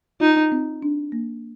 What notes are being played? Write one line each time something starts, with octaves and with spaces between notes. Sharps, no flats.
D#4 F4
C4
D4
A#3